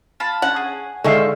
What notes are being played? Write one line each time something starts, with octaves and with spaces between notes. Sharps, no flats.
F4 A5 B5
C#4 F#5
G#4
G#2 D3 D#3 G#3 E5 F5 C6 C#6